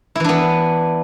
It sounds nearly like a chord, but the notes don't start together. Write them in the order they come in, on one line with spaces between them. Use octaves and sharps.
E4 E3 D4 B3